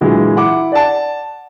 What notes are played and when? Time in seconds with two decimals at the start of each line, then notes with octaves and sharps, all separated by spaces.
0.01 A#2 D3 E3 F#3 G#3
0.36 E4 F#5 D6
0.72 D5 F#5 A5